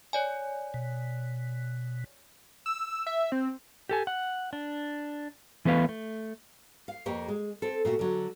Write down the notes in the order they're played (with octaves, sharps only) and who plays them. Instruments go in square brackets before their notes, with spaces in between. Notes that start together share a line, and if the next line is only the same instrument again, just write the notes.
[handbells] C#5 D5 G#5
[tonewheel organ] B2
[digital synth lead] E6
E5
C4
[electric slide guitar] G4 A4 G#5
F#5
D4
E3 A3 B3 B4 F5
A3
[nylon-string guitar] F5
F2 A#3 G4 C#5
G#3
C4 A4
A#2 A3 F#4
D3 F#3